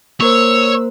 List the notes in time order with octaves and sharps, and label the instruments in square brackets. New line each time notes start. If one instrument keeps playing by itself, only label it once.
[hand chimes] A#3 A#4 C5 [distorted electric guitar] C#5 [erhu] E6